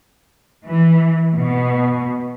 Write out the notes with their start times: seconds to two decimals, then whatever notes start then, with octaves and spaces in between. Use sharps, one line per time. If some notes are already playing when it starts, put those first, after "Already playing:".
0.66 E3
1.34 B2